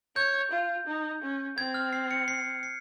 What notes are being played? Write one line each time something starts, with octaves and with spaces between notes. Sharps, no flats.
C#5 G6
F4
D#4
C#4
C4 G#6
F6
C7
C#7
C7
C7